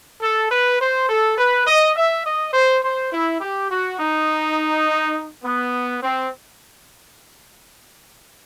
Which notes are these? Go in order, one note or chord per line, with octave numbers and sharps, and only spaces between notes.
A4
B4
C5
A4
B4
D#5
E5
D#5
C5
C5
E4
G4
F#4
D#4
B3
C4